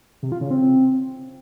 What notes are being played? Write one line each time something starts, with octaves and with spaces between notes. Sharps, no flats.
C3
F4
C#3
C4